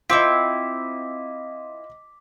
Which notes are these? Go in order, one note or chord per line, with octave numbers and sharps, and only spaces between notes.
C4 E4 F4 D#5 D6 B6